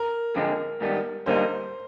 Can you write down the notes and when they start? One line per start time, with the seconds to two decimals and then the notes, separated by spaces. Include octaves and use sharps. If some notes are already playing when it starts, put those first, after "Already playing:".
Already playing: A#4
0.35 F2 D3 F3 G#3 A#4
0.81 G#2 D#3 G3 B3
1.26 D3 G3 A#3 D#4 C5